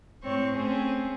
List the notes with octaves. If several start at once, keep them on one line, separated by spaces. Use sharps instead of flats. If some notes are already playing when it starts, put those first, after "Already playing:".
A2 C4 C#5 C#6
A3 C4 C#4 G#4